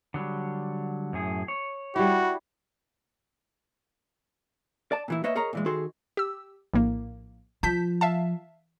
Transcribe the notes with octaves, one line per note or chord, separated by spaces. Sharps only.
D3 F#3 G3
F#2 A2 G#4
C#5
G3 E4 F#4
D5 A5
A#2 E3 E4
A#3 B4 C#5 D#5 E5
G#4 A#4 C#5 D#5 A#5
A#2 E3 G#3
D#3 F#4 G#4 A4 C6
G4 E6
A#1 A2 A#3
F3 A5 G6 B6
E5 F5 A5